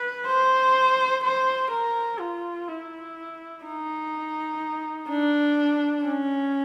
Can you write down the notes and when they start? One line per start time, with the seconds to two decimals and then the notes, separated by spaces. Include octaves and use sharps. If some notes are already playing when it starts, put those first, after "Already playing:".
Already playing: B4
0.26 C5
1.23 C5
1.71 A#4
2.19 F4
2.68 E4
3.64 D#4
5.09 D4
6.05 C#4